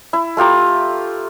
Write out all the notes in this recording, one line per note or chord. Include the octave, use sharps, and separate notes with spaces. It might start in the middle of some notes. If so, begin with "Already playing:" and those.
E4
A3 F4 G4 A#5